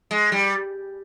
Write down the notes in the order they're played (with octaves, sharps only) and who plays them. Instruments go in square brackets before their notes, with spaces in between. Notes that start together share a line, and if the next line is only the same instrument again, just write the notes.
[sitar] G#3
G3